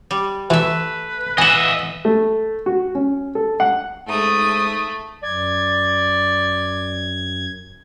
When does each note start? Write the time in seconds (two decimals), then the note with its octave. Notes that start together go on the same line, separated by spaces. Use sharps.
0.11 G3
0.50 E3 A3 B4 E5
1.38 E3 D#5 E5 F#5 G#5
2.05 A3
2.66 F#4
2.95 C#4
3.35 A4
3.60 F#5
4.08 G#2 A3 D#6
5.23 F#2 D5 G#6